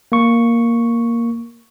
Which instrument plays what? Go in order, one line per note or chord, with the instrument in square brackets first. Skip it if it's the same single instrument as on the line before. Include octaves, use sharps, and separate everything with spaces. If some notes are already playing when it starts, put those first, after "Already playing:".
[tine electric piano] A#3 C#6